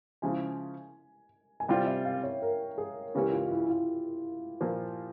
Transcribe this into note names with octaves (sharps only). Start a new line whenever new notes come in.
C#3 F3 G#3 E4 G#5
G#5
C3 G3 C4 F4 G5
E5
F5
C#5
A#4
G#4
C#2 C#3 E3 A#3 C#4 G4
F4
F4
E4
F4
A#2 F3 A#3